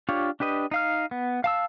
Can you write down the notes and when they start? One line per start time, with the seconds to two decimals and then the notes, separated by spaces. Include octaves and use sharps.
0.09 D4 F4 G4 C#5
0.40 D4 G4 B4 D#5
0.71 D#4 F5 F6
1.11 B3
1.44 F5 A5 E6